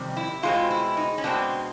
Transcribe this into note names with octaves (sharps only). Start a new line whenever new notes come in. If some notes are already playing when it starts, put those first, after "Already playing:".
Already playing: F2 C3 D#3 G3 C4
E4
B2 G#3 C4 F4
E4
D#4
C#4
B2 G#3 C4 D4